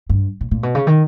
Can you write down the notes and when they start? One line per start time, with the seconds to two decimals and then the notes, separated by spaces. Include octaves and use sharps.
0.09 G2
0.41 A#2
0.51 A#2
0.63 B2
0.75 C#3
0.87 D#3